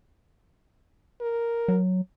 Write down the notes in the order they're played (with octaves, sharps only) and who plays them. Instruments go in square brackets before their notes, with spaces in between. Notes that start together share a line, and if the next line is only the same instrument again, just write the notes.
[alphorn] A#4
[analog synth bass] F#3